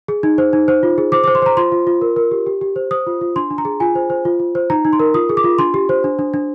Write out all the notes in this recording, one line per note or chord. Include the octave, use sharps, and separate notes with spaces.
G#4
D#4
C5
D#4
C5
F4
G#4
C5 D6
D6
C5
C6
C5 A#5
F4 C6
F4
F4
A#4
A#4
G4
G4
G4
C5
C5 D#6
F4
F4
D4 C6
D4
A#5
G#4
F4 G#5
C5
C5
F4
F4
C5
D#4 A#5
D#4
C6
A#4
F4 D#6
G#4
D6
F4
D4 C6
G4
C5
D4
D4
D4